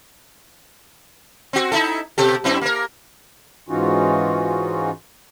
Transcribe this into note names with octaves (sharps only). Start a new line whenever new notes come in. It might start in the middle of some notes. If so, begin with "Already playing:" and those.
C4 F#4
D#4 E4 A4
B2 G4 A4
F#2 C4 E4
A#3 A#4
G#2 E3 C#4 D#4 F4 F#4